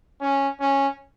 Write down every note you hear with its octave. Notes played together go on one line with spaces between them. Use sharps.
C#4
C#4